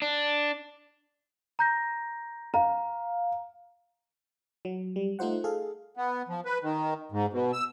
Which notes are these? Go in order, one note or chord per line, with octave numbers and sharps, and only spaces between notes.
D4
A#5 G6 A#6
F5 A#5
F#3
G3
A3 D#4 F4 C5 F#5
G#4 A4 F5
B3
F3
B4
D#3
G#2
B2
E6